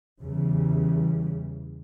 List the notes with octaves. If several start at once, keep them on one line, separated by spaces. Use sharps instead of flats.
E2 C#3 E3 G3